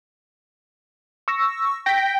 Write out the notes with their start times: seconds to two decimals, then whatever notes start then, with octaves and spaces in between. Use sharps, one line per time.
1.28 C#6 E6 A#6
1.86 G5 A#6 B6